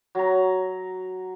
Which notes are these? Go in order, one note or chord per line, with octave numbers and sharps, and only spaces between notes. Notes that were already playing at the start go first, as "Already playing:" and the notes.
F#3 A#5